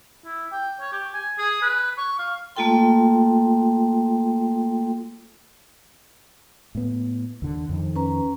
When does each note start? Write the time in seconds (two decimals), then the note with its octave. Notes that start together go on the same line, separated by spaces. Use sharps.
0.25 E4
0.52 G5
0.80 C#5
0.92 G4
1.14 G#5
1.38 G#4
1.62 B4
1.98 C#6
2.19 F5
2.56 A3 A#3 F4 A4 G5 C6
6.75 A2 B3
7.42 D#2 D3
7.69 F2 D#3
7.96 C#4 B4 A#5